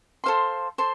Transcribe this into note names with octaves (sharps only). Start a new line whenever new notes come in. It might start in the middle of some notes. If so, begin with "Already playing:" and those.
A4 C5 F5 C6
A4 C5 C6